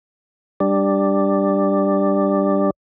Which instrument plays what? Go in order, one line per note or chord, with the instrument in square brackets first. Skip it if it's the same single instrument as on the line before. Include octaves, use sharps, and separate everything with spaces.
[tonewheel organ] G3 D4